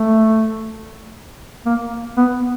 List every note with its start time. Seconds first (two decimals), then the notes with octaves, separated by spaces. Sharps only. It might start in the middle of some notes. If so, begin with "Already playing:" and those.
Already playing: A3
1.66 A#3
2.17 B3